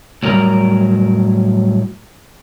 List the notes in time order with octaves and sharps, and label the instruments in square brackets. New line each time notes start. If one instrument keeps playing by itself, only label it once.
[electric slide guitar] A2 F#3 G3 A#4 A#5